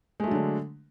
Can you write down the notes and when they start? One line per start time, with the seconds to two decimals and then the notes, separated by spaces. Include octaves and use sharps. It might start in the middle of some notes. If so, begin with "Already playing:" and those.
0.20 G#3
0.24 A3
0.27 F#3
0.31 D3
0.35 D4